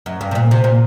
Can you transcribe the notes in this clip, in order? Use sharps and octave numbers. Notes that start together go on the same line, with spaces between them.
F#2
G2
C3
A#2
C3
A#2